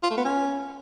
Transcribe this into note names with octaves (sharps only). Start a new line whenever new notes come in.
F4
A3
B3
C#4